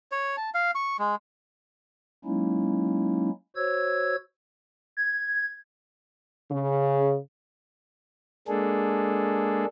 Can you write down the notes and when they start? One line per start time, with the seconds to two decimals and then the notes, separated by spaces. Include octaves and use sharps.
0.12 C#5
0.37 A5
0.54 F5
0.75 C#6
0.99 G#3
2.25 F#3 G#3 A#3 C#4 D#4 E4
3.56 F#4 C5 C#5 E6 G#6
4.97 G#6
6.51 C#3
8.48 G#3 A#3 D4 G#4 A4